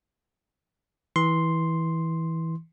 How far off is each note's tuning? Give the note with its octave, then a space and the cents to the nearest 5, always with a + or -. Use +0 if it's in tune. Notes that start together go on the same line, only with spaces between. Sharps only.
E3 -20 C6 +0